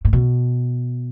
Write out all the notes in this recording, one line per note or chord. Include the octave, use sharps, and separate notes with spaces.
A2
B2